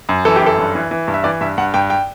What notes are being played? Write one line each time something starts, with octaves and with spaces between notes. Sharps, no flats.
F#2
E3 A4
G4
F#2 A4
G2
E3
E3
G2
E5
E3 D5
G2 E5
G2 F#5
G2 G5
G5